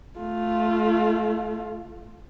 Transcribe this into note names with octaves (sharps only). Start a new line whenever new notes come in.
A3 F4